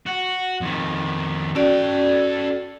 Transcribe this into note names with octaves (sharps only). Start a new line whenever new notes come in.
F#4
F2 D#3
C#4 F#4 A4 D5 G5